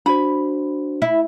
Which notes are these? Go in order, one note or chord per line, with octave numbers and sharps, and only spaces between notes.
D4 F#4 C5 B5
E4